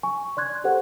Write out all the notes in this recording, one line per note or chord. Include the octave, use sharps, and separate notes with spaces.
G#5 C#6
D5 C6 F#6 G#6
G4 A4 C5 F#5